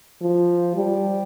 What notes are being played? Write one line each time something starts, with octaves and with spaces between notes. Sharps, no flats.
F3
G3